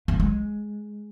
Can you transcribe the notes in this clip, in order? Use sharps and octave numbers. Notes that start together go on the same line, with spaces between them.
A3
G#3